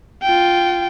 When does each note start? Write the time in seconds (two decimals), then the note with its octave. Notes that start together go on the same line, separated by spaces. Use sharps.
0.23 F4 G5